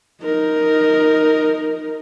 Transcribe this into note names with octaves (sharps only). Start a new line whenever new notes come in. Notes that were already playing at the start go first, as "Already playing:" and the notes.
D#4 A#4